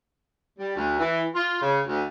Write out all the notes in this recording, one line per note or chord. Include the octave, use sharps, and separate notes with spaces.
G3
D2
E3
F4
C#3
D2